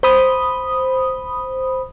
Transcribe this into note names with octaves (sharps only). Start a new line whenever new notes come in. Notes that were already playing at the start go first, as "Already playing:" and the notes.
C5 B5 D#6